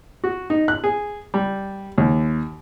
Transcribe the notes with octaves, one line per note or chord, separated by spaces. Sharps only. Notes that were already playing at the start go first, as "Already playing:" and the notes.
F#4
D#4
F#6
G#4
G3
D#2